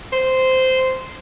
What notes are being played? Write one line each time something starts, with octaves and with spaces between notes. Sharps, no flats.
C5